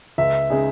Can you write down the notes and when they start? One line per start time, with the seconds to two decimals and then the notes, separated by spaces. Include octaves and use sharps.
0.18 C#2 E5
0.50 C#3 G#3 D#4 G#4